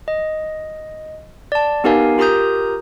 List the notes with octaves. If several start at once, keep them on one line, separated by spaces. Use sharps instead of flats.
D#5
D5 A5
B3 D#4 G4 A#4 F5 G#5
F4 G4 A#4 A#5 D#6 G6